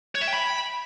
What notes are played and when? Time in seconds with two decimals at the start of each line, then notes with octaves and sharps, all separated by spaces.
0.15 C#5
0.21 E5
0.28 G5
0.34 B5